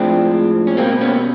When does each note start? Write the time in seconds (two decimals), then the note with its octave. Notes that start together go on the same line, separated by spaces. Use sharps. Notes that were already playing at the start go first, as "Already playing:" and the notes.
Already playing: A2 F3 G#3 C4 D4
0.67 C#4
0.77 B2 G3 A#3 C4
1.01 B3 C#4